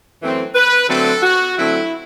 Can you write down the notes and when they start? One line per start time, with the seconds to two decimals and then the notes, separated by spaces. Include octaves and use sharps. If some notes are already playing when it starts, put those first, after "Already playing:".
0.21 F#2 E3 A3 C4
0.55 B4
0.88 D3 F#3 A3 C4 A4
1.23 F#4
1.57 D3 F#3 A3 C4 E4